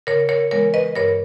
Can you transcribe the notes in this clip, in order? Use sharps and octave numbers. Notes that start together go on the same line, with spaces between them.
C#3 A#4 C#5
A#4 C#5
E3 G#3 B3 A#4 C#5
B4 D#5
G2 A#4 C#5